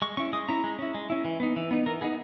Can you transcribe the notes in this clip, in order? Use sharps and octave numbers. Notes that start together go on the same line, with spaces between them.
G#3 C#6
C#4 E4 C#6
G#3 D#6
C#4 E4 A#5
G#3
C#4 E4
G#3
C#4 E4
E3
B3 D#4
E3
B3 D#4
E3 A#4
B3 D#4 G#4